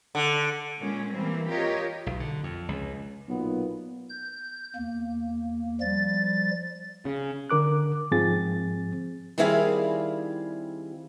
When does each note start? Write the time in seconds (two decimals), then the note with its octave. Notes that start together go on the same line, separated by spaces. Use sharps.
0.15 D3
0.80 A#2 G#3 C#4
1.13 E3 G3 A#3 C4
1.50 F4 G4 A#4 C#5 D#5
2.06 B1
2.20 D3
2.43 F2
2.68 C#2
3.28 B1 A#2 B3
4.10 G6
4.76 E2 A#3
5.81 F3 G3 A6
7.05 C#3
7.50 D3 A#4 D6 F#6
8.11 G#2 F3 C4 G#4 A6
9.38 D#3 G3 C4 E4 G#4 F5